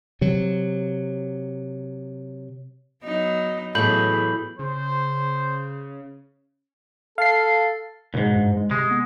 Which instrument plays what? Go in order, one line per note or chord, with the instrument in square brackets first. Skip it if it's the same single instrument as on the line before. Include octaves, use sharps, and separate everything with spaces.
[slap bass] C3 F#3
[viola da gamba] F#3 B3 D#4
[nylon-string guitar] A2 E3 [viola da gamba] F#3 B3 G#4 [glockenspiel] B5 G6 F#7
[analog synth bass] C#3 [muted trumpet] C5
[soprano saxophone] A4 [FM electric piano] F5 C7
[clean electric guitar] D#2 G#2 [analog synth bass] B2
[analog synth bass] G2
G#3
[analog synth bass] C3 [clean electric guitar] G#3
[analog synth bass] B3